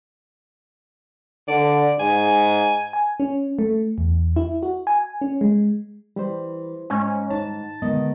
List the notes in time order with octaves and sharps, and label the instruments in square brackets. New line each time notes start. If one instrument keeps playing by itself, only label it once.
[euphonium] D3 [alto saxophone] D5
[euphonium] G#2 [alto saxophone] G#5
[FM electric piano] G#5
C#4
A3
E2
E4
F#4
G#5
C#4
G#3
[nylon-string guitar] E3 [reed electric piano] G3 C5
[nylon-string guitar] G#2 [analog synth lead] C#4
[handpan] D#4 [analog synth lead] A5
[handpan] D3 G#3 B3 [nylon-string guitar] D#3 [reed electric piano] D#5